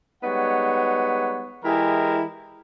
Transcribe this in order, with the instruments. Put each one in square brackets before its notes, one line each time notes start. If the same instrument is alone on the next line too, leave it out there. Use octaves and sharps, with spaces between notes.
[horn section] G3 G#3 B3 D#4 C#5 F#5
E3 G#3 E4 G4 G#4 A#4